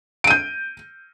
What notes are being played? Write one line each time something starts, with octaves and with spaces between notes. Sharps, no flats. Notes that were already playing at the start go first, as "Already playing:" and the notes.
G6 D7 D#7